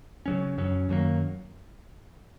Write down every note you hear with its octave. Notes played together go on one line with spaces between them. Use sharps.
C#3 F#3 C#4
F#2 F#3 C#4
F#2 D#3 F#3 A#3